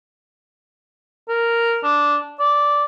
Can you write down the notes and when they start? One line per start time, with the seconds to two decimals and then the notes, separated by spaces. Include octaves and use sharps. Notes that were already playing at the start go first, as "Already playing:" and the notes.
1.28 A#4
1.84 D4
2.39 D5